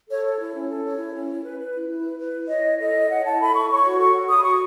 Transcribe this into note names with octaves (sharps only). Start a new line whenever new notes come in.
A4 C#5
C#5
E4
C#4
A4
C#5
E4
C#4
E4
B4
B4
E4
E4
B4
B4
E4
C#5 D#5
E4
A4 D#5
E4
C#5 F#5
E4 A5
A4 B5
E4 C#6
C#5 C#6
F#4
A4 C#6
F#4
C#5 D#6
B5
F#4 C#6